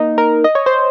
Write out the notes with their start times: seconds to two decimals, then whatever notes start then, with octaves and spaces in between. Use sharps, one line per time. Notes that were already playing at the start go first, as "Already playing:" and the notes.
Already playing: A#3 D#4
0.18 A#4
0.44 D#5
0.55 C#5
0.66 C5